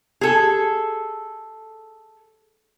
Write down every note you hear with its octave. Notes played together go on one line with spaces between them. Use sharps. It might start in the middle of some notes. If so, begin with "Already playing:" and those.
G#4 A4